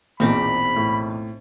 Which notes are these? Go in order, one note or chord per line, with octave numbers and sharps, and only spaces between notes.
A#1 E2 B2 C4 D#4 B5 D6
A2